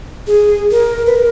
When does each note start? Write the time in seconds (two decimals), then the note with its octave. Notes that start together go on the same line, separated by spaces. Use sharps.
0.27 G#4
0.71 A#4
1.06 B4
1.16 A#4